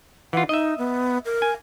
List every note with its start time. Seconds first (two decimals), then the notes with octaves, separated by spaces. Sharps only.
0.33 E3 F4 F#5
0.49 D#4 D#5 E5
0.78 B3
1.25 A#4
1.42 G#5